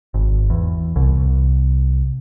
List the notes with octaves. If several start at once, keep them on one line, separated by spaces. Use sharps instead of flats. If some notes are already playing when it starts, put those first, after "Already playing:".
G#1
E2
C2